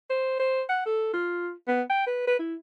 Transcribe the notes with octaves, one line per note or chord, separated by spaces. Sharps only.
C5
C5
F#5
A4
F4
B3
G5
B4
B4
E4